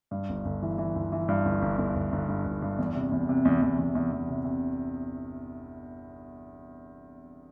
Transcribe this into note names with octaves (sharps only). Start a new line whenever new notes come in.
G2
G1
G1
E3
E3
G1
E3
G2
G1
G1
G1
G1
G1
G2
G1
G2
E2
C3
E2
C3
E2
E2
E2
E2
E2
C3
C3